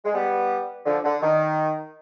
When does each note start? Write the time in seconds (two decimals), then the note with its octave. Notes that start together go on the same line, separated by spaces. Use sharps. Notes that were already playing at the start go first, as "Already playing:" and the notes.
0.05 G#3
0.14 G3 B3
0.86 D3 F3
1.04 D3
1.22 D#3